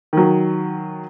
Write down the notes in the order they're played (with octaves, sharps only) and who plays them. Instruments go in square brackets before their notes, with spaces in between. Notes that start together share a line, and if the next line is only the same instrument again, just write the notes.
[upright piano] D#3 F#3